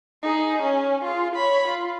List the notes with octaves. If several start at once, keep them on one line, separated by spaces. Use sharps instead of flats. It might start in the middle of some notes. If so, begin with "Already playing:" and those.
D#4 G#4
C#4
F4 G#4
C#5 B5
F4